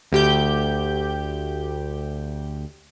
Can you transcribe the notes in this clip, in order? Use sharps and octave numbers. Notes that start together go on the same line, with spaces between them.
D2 G4 G6